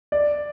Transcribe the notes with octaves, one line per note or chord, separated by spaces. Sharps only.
D5